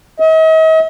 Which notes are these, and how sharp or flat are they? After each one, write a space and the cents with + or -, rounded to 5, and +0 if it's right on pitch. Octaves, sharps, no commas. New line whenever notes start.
D#5 +45